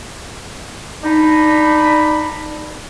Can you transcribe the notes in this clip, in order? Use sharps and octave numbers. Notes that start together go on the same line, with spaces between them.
D4 D#4 B5